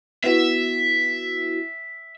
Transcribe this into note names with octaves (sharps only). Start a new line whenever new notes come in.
B3 E4 F#4 E5